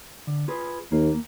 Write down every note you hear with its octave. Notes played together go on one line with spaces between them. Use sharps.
D3
F4 G#4 B4
D#2 A#3